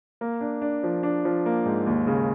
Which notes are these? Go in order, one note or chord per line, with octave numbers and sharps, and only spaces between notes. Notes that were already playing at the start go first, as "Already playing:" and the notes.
A#3
D4
D4
F3
D4
F3
A#3
G#2
D#2
C#3